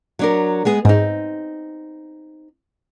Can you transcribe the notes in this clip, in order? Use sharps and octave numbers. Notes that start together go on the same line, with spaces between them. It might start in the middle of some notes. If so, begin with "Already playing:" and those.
F#3 D4 A#4
G#3 B3 G#4
G#2 C4 D#4